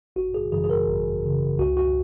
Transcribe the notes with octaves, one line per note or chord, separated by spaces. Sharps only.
G#1 F#4
G#4
F#2 C#3 E3 G#4
G#4
A#4
G#1
F#2 C#3 E3
C#2 F#4
F#4